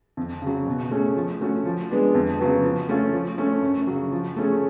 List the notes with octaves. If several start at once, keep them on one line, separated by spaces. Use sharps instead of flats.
F2
C#3 F#3
B2
A3 C#4 G#4
F3
A3 C#4 F#4
F3
G#3 B3 D4
F2
C#3 F#3 B3
F3
A3 C#4 F4
F3
A3 C#4
F#2
C#3 F#3
F3
A3 C#4 G#4